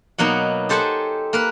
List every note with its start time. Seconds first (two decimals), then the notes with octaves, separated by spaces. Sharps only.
0.18 B2 F#3 A#3 B3 D#4
0.69 G4 A4 C5 F#5 G#5 A5
1.33 A#3 A#4 B4